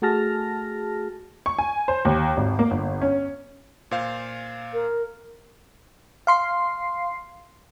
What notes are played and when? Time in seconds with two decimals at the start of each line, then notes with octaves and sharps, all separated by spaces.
0.02 A3 F#4 G#4 A5 F6 A#6
1.46 C#6
1.58 G#5
1.88 C5
2.05 D#2
2.37 G#1
2.59 A#3
2.71 G1
3.01 C#4
3.91 A#2 C5 F5
4.73 A#4
6.27 F5 C6 C7